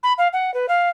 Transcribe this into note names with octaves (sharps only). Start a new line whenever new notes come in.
B5
F5
F#5
B4
F5